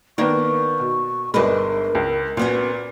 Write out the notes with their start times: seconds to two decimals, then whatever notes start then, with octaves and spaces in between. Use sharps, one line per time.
0.18 D#3 A#3 B3 D4 C#6
0.80 B2
1.34 G1 G#3 D4 D#4 A#4 B4
1.95 C#2
2.37 A#2 F#3 B3 C#4